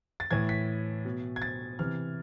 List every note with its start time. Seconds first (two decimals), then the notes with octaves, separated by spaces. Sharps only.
0.20 A6
0.31 A2 E3 G#6
0.49 B6
1.05 B2
1.36 G#6
1.42 A6
1.79 C3 E3 F6